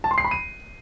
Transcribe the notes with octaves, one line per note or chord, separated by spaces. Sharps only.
A5
C6
C7
B5
D#7